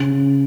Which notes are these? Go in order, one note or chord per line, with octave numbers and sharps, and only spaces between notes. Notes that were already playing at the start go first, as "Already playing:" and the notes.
Already playing: C#3